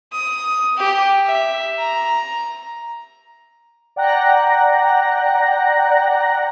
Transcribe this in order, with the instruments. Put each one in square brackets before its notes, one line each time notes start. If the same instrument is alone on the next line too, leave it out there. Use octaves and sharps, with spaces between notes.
[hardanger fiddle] D#6
G4
E5
A#5
[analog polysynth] D5 F#5 G5 A#5 F#6 A#6